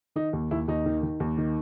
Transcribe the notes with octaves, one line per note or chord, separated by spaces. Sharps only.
D#3 D#4
D#2
D#2 E4
D#2 D#4
D#3
D#3
D#2
D#3